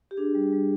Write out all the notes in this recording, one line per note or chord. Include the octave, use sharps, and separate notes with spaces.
G4
D4 G#4
G3
G3